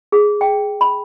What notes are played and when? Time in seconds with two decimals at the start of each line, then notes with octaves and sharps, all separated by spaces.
0.12 G#4
0.41 G5
0.81 B5